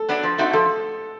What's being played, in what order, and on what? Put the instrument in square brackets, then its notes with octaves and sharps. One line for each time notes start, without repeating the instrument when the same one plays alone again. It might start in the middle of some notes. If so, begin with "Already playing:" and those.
Already playing: [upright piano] A4
[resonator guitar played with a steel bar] F#3 B3 D4
F3
A3 C4 D#4 F#4
[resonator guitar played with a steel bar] F3 [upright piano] A4